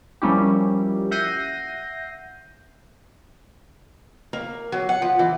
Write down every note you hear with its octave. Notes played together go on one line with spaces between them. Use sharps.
F3 G3 A#3 C#4 E4 G4
E5 F#5 G6 A#6 C7 D#7
A#3
F#3
F#5
F3
E3